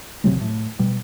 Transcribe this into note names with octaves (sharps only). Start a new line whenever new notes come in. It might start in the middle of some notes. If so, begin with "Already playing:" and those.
G#1 C3 F#3 G#3
A2
B2 G3